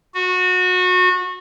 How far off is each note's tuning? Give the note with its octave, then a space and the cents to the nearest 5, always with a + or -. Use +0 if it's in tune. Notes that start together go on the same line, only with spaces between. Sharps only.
F#4 -25